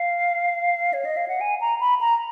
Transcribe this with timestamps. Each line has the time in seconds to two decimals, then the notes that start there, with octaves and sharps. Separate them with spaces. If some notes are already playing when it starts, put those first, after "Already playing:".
Already playing: F5
0.93 C#5
1.05 D#5
1.17 F5
1.28 F#5
1.41 G#5
1.61 A#5
1.80 B5
2.01 A#5